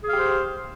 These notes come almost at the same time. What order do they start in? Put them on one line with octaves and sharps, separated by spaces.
G#4 F5 G4 C5